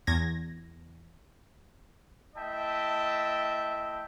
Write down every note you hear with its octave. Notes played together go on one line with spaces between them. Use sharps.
E2 G#6 A#6
A3 E4 D#5 E5 G5 A5